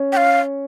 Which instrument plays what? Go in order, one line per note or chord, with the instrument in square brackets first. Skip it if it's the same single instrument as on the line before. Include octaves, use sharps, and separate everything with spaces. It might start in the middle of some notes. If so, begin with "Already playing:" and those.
Already playing: [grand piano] C#4
[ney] G5
F5